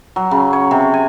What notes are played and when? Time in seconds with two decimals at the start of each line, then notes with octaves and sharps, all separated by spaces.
0.16 F#3
0.31 C#3
0.53 C#5
0.71 C3
0.94 G#5